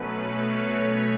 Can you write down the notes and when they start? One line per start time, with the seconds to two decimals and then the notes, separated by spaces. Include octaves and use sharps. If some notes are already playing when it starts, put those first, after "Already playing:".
Already playing: B2 F#3 A3 C#4 B4
0.44 C#5